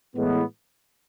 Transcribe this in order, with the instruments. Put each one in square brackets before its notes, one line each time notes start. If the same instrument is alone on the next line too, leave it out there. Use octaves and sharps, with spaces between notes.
[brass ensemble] A2 E3 G#3 B3